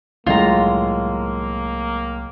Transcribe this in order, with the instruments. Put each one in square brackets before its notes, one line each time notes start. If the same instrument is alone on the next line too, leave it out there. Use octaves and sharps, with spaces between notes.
[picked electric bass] C2 F#3 [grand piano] A2 G#3 [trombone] A#3 [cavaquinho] F4 A#5